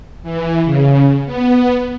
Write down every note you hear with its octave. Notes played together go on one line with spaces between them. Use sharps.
E3
C#3
B3